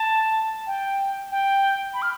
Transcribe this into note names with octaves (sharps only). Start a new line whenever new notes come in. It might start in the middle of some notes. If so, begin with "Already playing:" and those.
Already playing: A5
G5
G5
B5
F6